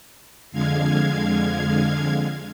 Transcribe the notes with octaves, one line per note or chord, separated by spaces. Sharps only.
F2 D3 G#3 F5 G#6